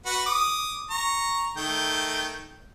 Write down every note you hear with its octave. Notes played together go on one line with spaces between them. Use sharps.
F#4 B4 F#5
D6 D#6
A#5 C#6
D#3 A3 G5